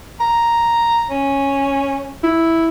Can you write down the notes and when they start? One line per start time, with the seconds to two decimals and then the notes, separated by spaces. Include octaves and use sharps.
0.20 A#5
1.10 C#4
2.23 E4